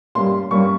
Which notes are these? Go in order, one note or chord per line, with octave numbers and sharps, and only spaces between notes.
G2 G3 A#3 C#4 C6
G2 G3 A#3 C#4 C#6